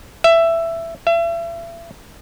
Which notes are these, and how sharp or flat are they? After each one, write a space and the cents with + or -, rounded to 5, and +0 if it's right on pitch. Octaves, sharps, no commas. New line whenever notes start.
E5 +15
E5 +40